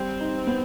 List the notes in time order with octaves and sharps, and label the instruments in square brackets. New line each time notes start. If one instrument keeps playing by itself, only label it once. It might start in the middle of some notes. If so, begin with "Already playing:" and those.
Already playing: [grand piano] G3 [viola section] C4
[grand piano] D#4
B3